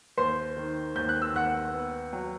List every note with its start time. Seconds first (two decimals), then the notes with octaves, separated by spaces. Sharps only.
0.17 D#2 C5 C6
0.57 D#3
0.95 D#2 G6
1.09 F#6
1.22 E6
1.34 D#2 F#5 F#6
1.74 B3
2.13 F#3